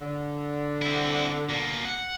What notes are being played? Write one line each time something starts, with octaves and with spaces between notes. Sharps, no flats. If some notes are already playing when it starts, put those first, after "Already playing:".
D3
C4 E4
B2 A#3
F#5